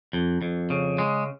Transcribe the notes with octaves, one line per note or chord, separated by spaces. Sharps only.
F2
F2
C#3
G#3